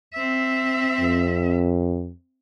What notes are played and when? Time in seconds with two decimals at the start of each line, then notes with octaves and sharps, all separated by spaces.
0.13 C4 E5
1.01 F2